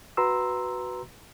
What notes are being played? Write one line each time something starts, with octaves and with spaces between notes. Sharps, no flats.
F#4 B4 A#5 C6 E6